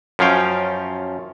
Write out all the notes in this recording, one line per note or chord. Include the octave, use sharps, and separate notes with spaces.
F#2 F3 C#4 F5 G5